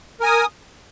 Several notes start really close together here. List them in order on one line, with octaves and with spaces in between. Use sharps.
A#4 G#5 D#6